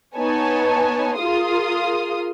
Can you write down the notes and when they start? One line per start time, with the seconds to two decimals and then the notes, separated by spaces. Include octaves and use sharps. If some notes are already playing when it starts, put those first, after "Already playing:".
0.17 B3 D#4 B4 C#5 G#5 A5
1.16 F4 G#4 A#4 F5 C6 D#6